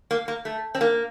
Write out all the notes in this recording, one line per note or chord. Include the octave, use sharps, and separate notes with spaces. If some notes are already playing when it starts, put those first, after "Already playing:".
A#3
A#3
A3
C4
A#3